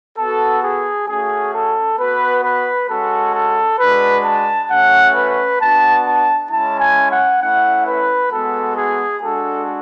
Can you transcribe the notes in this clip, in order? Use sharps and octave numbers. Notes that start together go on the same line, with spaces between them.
B3 F#4 A4
G#4
A3 C#4 F#4 G#4
A4
B3 F#4 B4
B4
G#3 C#4 F#4 A4
A4
G#3 D4 F#4 B4
A5
A3 C#4 F#4 F#5
B4
B3 D4 F#4 A5
A5
G#3 C#4 E4 A5
G#5
F#5
A3 C#4 E4 F#5
B4
G#3 B3 F#4 A4
G#4
G#3 D4 F#4 A4